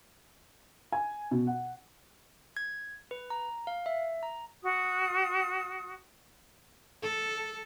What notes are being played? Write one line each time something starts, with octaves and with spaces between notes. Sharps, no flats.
G#5
B2
F#5
G#6
B4
A#5
F5
E5
A#5
F#4 D#6
A4